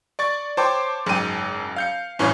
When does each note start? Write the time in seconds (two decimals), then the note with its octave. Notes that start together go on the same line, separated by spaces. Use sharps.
0.19 D5 C#6 A6
0.57 C5 C#5 G5 A5 C6 D6
1.06 F#1 G#2 G5 D#7
1.76 F5 G6 C#7
2.19 A1 G2 E3 C#4